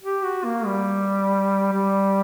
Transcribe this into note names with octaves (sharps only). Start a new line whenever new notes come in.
G4
F#4
A#3
G3
G3